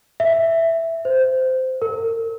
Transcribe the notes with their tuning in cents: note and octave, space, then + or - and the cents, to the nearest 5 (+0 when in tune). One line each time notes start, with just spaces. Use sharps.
E5 +5
C5 -15
A#4 -40